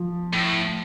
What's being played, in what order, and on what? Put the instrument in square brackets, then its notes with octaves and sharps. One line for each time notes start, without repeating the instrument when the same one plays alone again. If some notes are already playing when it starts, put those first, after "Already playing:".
Already playing: [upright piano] F3
[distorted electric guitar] A2